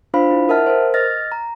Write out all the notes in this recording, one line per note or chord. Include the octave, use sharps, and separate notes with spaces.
D4 F4 C5 F5 B5
E4
A#4 D#5 E5 F#5 A5 F6
A#4 C5
D#5 F6 A6 A#6
A#5